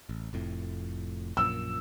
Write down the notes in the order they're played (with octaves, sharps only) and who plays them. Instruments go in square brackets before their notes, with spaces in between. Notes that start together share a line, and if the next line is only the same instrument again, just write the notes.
[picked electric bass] A1
F1 F2 A2
[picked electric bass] A#1 F#2 A#2 [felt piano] E6